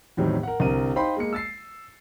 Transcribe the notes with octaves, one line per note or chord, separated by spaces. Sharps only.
E2 A2 D#3 F#3 G3 C4
A#4 F#5
C2 D3 C4 A#4 D#7
D#4 C5 F5 G5 B5 C6
G#3 A#3 C#7
E6 A6 C7